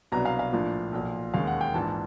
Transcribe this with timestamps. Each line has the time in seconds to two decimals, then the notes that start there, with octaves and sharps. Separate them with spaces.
0.12 C2 B2 F#3 B3 D4 A#5
0.25 F5
0.39 F5
0.53 A#1 A2 F3 A#3 D4
0.93 B1 A#2 F3
1.33 E1 D#2 D#3 G#3 C#4 F5
1.47 F#5
1.61 G5
1.74 A#1 G#2 E3 A5